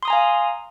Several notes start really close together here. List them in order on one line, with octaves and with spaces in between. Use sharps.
C6 D#6 A#5 G#5 F5